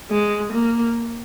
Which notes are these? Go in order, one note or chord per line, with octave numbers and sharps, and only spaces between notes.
G#3
A#3